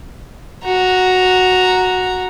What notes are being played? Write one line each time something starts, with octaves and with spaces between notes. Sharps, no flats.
F#4 A#5